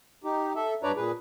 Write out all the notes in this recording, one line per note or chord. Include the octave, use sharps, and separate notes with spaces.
D#4 G4
A4 E5
G2 D4 B4 C#5 D5 A#5
A#2 G#4 B4